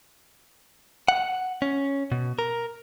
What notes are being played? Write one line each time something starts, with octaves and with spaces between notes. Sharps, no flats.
F#5
C#4
B2
A#4